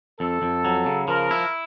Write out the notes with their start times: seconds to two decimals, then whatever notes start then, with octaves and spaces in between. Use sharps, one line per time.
0.20 F2 A4
0.42 F2
0.65 F#3
0.86 C#3
1.08 F3 A#4
1.31 E4